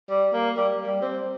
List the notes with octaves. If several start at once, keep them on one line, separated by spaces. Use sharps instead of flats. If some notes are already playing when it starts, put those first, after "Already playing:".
G3
A#3
G3
G3
C4